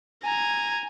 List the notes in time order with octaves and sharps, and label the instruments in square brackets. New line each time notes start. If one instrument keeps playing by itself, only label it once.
[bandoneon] G#5 [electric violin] A#5 G#6